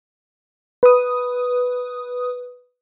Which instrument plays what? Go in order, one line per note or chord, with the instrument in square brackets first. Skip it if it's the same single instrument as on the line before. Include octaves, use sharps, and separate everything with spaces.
[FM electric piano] B4 D#6